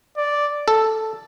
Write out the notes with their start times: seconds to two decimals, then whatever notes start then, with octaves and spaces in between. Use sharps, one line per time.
0.17 D5
0.68 A4